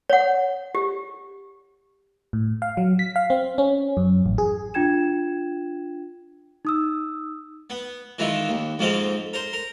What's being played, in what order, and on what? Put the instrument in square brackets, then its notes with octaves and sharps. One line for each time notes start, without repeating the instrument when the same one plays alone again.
[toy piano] C#5 F#5
G4
[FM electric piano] A2
F5
F#3
B6
F5
C4
C#4
F#2
A1
G#4
[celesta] D4 F4 G5 G#6 E7
D#4 D#6 E6
[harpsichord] B3
D#3 E3 G#3 E4 F4
D#2
F2 G#2 F3 G#3 C4 F5
A#4 C5
A#4